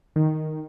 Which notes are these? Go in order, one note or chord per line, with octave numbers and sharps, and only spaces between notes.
D#3